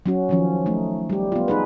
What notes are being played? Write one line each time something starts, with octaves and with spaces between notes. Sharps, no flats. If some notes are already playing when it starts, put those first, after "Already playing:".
F#3 C#4 F#4
D#3 F3 C#4
A3 D#4
G3 G4
B3 F4
D#4 G#4 B4